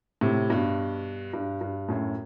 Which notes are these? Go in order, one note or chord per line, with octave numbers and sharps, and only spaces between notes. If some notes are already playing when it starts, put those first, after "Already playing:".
A2 C3
G2 B2
G2
G2
F#2 A2